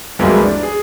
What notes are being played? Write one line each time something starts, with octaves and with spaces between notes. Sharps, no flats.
C2 F2 E3 F#3 G#3 A#3
D4
G#4